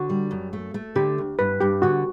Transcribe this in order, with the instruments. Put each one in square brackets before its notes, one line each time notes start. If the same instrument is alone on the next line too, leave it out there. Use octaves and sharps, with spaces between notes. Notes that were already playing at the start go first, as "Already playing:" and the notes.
Already playing: [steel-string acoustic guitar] D3 [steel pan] F#4
[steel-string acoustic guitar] G3
F#2
A3
A3
[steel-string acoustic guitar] D3 [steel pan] G4
[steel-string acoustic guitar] D2
[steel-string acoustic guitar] G2 [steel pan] B4
[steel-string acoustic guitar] G2 [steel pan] G4
[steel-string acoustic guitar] D3 [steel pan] F#4